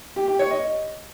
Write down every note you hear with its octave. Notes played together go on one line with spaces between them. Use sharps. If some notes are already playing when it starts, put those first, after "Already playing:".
G4
G4
C#5
D#5